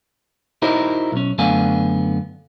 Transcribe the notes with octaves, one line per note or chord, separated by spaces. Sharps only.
D#4 E4 F#4 A#4 C5 D#5
B1 C#4
F#2 D3 A3 B3 F5 G#5